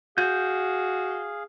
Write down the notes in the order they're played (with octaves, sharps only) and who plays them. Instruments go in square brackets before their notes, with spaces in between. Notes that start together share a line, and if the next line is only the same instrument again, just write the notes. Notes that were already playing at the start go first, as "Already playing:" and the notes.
[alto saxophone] F#4 [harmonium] G#4 F5 [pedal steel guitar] G6